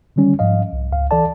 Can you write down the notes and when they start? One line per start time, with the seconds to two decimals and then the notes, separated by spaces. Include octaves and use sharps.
0.16 D3 D#3 G3 C#4
0.39 G#2 F3 D#5 F5
0.73 C2
0.92 C#2 F5
1.11 E3 A4 D5 A5